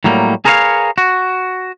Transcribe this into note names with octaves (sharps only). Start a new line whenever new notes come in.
A2 F#3 G3 A#3
G#4 A#4 B4 C#5 D#5 F5
F#4